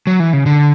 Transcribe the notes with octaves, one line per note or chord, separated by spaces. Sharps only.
F#3
E3
C#3
D3